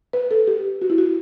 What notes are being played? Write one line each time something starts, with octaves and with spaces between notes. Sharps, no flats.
B4
A4
G4
F#4
E4
F#4